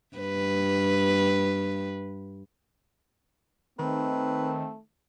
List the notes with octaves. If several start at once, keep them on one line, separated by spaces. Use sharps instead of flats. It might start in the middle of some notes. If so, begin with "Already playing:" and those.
G2 B4
D#3 A3 C4 B4